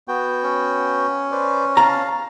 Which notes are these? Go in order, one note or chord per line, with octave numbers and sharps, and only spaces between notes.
B3 F#4 G5
C#4
B4 C5 D5
F5 A5 A#5